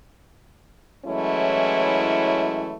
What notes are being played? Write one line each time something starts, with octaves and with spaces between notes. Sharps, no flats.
E3 F#3 G#3 A3 C#4 E4